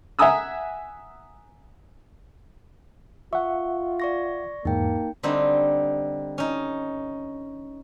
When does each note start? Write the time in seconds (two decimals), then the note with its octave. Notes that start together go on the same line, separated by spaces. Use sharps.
0.19 E5 F#5 G#5 A#5 D#6 E6
3.33 F4 E5 F#5 C#6
4.00 D5 C#6 A#6
4.65 E2 G#2 A#3 D#4 G5
5.23 D3 G3 C4 D#4
6.38 C#4 D#4